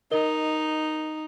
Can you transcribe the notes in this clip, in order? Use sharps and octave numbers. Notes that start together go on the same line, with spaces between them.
D#4 A#4 D#5 G7